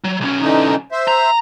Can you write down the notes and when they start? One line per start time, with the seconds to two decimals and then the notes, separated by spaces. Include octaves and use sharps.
0.04 F#3
0.21 B1 C#4
0.41 D3 E3 D#4
0.92 C5 E5
1.08 A#5